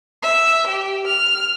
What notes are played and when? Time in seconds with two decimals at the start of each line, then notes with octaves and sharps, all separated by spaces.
0.22 E5
0.67 G4
1.07 F6